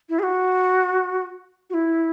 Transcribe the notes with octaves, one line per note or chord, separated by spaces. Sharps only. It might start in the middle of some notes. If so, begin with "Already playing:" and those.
E4
G#4
F#4
F#4
E4